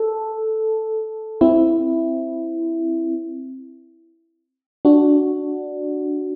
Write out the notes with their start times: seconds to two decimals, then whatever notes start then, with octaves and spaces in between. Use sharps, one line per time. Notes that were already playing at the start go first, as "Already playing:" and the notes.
Already playing: A4
1.41 C4 E4
4.85 D4 F#4